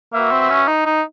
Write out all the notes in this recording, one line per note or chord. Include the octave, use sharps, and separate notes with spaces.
A#3 F#4 B4 E5
C4
C#4
D#4
D#4